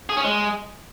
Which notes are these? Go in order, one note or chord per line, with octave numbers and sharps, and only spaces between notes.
G#4
C#4
G#3